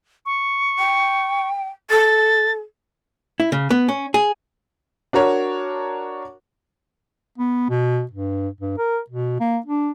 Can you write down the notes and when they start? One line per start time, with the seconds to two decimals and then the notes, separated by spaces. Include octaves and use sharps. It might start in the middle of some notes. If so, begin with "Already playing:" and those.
0.26 C#6
0.79 G5
1.90 A4 A6
3.40 E4
3.52 C#3
3.70 B3
3.88 C#4
4.14 G#4
5.13 D4 F#4 A#4 C#5
7.38 B3
7.70 B2
8.11 G2
8.61 G2
8.78 A#4
9.10 B2
9.40 A#3
9.66 D4